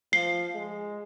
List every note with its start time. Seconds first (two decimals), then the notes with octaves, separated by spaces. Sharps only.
0.13 F3 C7
0.54 G#3